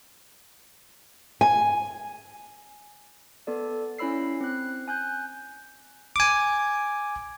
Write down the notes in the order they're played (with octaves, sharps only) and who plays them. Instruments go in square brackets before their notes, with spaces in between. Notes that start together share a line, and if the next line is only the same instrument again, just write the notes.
[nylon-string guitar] G#5
[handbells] B3 A4 D5
C#4 E4 C#5 B5 E6 C7
C4 F#6
G#5 F#6 G6
[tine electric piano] G#5 D6